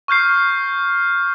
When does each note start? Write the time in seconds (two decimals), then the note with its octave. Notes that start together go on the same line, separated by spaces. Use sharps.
0.08 C#6 F6 G6 C7